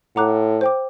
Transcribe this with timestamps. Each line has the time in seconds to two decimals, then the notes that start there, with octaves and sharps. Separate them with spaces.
0.16 A2 F#5 A#5 D6 F#6
0.61 C5 G5 D6